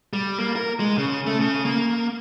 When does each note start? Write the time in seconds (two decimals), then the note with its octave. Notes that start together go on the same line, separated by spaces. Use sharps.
0.13 G3
0.39 A#3
0.56 A#4
0.80 G#3
0.98 C#3
1.27 A3
1.40 C#3
1.65 A#3